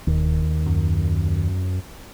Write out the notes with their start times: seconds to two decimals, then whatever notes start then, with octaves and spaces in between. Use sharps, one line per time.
0.07 E1 D#2
0.66 F#2